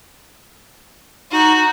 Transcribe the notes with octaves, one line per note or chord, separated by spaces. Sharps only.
D#4 F#4